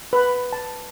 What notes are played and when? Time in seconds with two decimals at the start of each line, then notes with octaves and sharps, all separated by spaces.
0.13 B4
0.53 A5